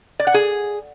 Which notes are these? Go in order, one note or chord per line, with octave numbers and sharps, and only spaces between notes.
D5
F#5
G#4